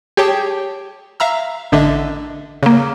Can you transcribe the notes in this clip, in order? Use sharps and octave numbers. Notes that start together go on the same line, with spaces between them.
G4 G#4 C#5 G5 A5
E5 F5 A#5 E6
A1 D3 D4 D#5 E5
C#3 A#3